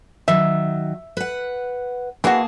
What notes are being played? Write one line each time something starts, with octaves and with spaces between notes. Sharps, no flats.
D#3 F#3 E5
B4 F#5
E3 A#3 F#4 G#4 A5